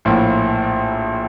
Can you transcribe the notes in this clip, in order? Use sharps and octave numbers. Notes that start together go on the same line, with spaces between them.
A#1 A2 F3 A#3 E4